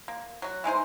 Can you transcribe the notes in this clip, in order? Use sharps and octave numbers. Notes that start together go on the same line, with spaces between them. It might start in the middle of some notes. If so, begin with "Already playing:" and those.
A#3
F#3 F#4
E3 G#3 D#4 C5